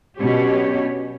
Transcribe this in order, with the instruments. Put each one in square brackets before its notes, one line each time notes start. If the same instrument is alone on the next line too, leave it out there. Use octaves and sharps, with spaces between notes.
[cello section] B2 F#3 C#4 D4 G4 C#5